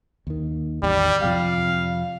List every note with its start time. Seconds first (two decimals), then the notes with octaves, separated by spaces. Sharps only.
0.27 D#2 D#3
0.83 A1 E2 D#3 G3
1.23 F2 C3 F3 F5